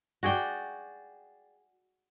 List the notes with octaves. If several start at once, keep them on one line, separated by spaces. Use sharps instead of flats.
F#4 G#4 D5 G5